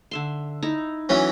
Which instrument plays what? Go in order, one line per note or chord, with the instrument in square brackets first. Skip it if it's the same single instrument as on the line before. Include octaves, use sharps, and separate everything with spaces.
[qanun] D3 E5 C6
D#4 E4 A#5
[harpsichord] E3 F#3 C#4